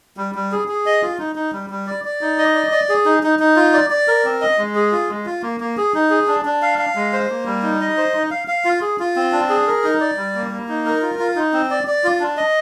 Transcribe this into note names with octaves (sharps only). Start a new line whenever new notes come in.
G3
G3
G#4
G#4
D#5
F4
D#4
D#4
G3
G3
D5
D5
D#4
D#5
D5
D5
G#4
D#4
D#4
D#4
F4
D5
D5
A#4
C4
D#5
G#3
G#4
F4
G#3
F4
A#3
A#3
G#4
D#4
G#4
D4
D4
F5
F5
G#3
C5
A#3
G3
D#4
D#5
C5
D#4
F5
F5
F4
G#4
F4
C4
D4
G#4
A#4
D#4
D5
G3
A#3
A#3
D#4
A#4
F4
F4
D#4
C4
D5
D5
F4
D4
D#5